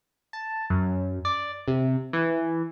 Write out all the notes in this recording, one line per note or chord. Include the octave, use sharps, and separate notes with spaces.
A5
F#2
D5
C3
E3